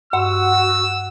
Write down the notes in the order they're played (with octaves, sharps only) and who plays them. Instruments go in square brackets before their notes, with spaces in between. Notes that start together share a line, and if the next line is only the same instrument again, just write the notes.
[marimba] G2 C6 [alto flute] F#4 [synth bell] F#5 [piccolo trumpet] E6